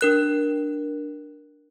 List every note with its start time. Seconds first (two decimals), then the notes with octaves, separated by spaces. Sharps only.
0.01 D4 A#4 F#6